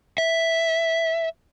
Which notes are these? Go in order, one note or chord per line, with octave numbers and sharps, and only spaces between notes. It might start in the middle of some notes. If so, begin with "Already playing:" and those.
E5